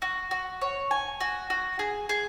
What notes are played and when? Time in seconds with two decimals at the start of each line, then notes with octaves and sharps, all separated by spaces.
0.02 F#4
0.31 F#4
0.61 C#5
0.91 G#5
1.20 F#4
1.50 F#4
1.79 G#4
2.09 G#4